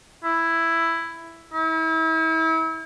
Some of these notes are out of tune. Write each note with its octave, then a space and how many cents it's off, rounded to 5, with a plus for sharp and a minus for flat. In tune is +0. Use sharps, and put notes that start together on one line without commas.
E4 +5
E4 -35